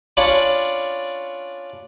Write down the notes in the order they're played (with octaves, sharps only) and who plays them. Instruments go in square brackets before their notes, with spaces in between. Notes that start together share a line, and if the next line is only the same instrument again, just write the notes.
[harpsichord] C#4 D4 F4 C#5 D5 B5